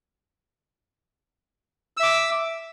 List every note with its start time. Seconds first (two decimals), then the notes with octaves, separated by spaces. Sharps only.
1.97 E6
2.00 E5
2.03 D6